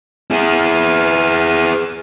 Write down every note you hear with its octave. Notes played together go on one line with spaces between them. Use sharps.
E4 G#4